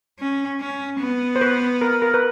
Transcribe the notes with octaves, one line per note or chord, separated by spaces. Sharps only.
C#4
C#4
B3
C5
B4
A#4
A#4
B4